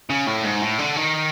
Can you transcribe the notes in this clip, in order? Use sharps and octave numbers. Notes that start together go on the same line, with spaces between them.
C#3
A2
G#2
A2
D3
D#3